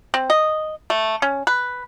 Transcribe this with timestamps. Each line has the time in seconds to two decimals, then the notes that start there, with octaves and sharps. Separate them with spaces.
0.14 C4
0.30 D#5
0.90 A3
1.22 C#4
1.47 B4